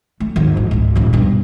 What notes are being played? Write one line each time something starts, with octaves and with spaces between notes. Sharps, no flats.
A3
G#1 D#2
A1
C#2 G#2
D#1 C#3
G2 B2